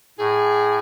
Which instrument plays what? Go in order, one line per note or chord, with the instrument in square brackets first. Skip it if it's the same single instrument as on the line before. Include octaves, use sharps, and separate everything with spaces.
[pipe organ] A2 [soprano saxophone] G#4